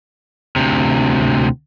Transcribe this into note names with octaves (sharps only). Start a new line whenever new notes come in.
D2 C3